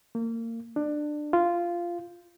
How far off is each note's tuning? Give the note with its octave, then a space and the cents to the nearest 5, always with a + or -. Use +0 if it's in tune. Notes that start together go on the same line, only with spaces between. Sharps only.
A#3 -30
D4 +20
F4 -10